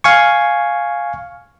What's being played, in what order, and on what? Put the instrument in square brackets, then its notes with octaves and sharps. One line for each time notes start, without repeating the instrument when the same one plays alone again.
[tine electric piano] F5 G#5 C#6